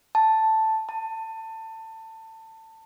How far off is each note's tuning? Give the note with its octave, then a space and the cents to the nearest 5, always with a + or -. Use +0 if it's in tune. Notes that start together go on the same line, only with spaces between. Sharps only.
A5 +0
A5 +20